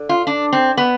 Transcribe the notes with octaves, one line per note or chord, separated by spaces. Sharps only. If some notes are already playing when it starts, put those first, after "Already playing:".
Already playing: D3
F4
D4
C4
B3